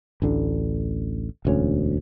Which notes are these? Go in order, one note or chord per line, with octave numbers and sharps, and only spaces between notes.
A1 D2 D3
E1 D2 C#4